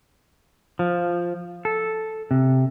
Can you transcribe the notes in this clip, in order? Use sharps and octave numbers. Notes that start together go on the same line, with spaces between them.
F3
A4
C3